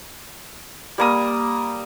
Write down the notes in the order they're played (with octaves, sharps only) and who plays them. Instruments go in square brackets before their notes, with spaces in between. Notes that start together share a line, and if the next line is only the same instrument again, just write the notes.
[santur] G3 A#3 D#6